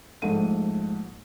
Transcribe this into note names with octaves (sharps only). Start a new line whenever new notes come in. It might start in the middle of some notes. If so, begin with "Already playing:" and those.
A#1 G#2 A3 D#7